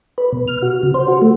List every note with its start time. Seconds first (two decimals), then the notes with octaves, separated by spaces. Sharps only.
0.18 B4
0.32 B2
0.48 F6
0.62 F#4
0.83 C#3
0.94 C5
1.08 F#4
1.22 A3